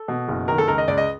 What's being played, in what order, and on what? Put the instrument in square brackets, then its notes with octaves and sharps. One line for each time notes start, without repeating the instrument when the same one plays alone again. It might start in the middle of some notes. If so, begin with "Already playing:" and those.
Already playing: [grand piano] A4
B2
F#1
D#3 A#4
A4
C#2 A#4
D#5
C#2 D5
D#5